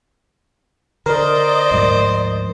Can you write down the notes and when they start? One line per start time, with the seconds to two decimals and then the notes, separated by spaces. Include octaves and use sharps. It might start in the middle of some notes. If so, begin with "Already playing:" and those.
1.06 D3 A#4 C5 D5 D#5
1.71 D2 G#2 F3